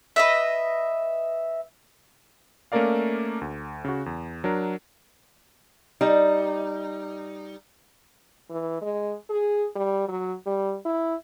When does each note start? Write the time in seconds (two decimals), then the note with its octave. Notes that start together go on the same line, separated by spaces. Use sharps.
0.16 B4 D#5 E5
2.72 A3 A#3 C#4 A#4 D5 F5
3.41 D2
3.85 C#3 F#4
4.06 E2
4.44 F#3 D4 A#4
6.01 G3 D#4
8.50 E3
8.81 G#3
9.30 G#4
9.76 G3
10.08 F#3
10.46 G3
10.85 E4